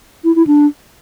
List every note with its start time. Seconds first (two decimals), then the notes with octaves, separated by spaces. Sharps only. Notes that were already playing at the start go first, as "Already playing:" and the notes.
0.24 E4
0.36 E4
0.47 D4